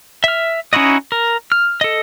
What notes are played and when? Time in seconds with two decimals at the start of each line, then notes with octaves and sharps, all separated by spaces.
0.24 E5 F6
0.73 C#4 D#4 E4 F#4 D#5
1.12 A#4
1.52 F6
1.81 A4 D#5